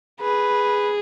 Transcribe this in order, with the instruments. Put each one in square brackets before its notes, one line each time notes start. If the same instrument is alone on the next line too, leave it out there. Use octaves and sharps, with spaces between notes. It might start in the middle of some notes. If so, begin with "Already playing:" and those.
[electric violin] G#4 [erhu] B4